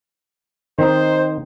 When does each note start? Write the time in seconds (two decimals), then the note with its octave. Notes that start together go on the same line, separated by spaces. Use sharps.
0.79 D#3 C4 D#4 C5